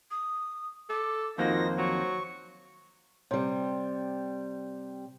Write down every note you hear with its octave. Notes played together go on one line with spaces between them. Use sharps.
D#6
A4 D6
F2 D#3 A#3 D#4 F4 F#4 C5 A#6
F#3 C#6
C3 G3